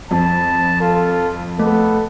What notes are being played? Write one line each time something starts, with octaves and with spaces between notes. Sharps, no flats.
F2 A5
F4 A4
A3 B3 A4